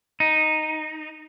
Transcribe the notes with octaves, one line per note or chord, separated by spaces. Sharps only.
D#4